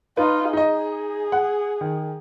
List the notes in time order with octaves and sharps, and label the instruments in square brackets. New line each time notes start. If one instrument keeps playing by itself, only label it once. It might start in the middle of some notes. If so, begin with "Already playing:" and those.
[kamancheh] D#4 F4 [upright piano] B4
[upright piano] D#4 D#5 [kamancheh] G#4
[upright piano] F#5
D#3